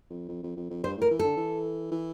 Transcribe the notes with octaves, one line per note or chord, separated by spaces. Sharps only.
F2
F2
F2
F2
F2
G2 C5
A2 A#4
E3
A4
D3
E3
E3